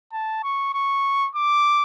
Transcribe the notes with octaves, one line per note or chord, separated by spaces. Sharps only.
A5
C#6
C#6
D6